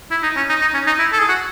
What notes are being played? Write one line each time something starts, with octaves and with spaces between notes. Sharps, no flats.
E4
D#4
C#4
D#4
D#4
C#4
D#4
E4
A4
G#4
F#4